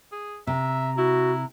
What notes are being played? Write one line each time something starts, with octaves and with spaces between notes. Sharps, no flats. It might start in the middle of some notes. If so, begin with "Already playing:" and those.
G#4
C3 E5 A#5
E4 F#4